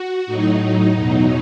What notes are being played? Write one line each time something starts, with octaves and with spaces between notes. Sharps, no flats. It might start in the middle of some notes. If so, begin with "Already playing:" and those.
Already playing: F#4
A2 F#3 D#4
E2 B2 F#3